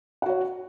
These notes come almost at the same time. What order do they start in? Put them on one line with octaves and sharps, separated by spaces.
F#5 F#4 C#5